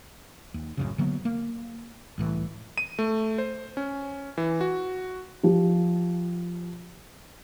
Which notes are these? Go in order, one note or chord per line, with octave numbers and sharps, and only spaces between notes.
D#2
A1 F#2 C#3
D3 F#3 A#3 B3
A#3
C2 A2 E3
D#7
A3
C5
C#4
E3
F#4
F3 G4